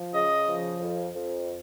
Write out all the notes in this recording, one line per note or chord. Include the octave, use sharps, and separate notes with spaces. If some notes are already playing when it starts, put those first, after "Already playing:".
Already playing: F3
C#3 D#5
F3
F2
F2